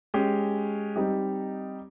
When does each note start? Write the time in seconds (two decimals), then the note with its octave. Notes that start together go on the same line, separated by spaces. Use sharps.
0.14 G#3 C#4 G4
0.96 G3 C4 D#4 G4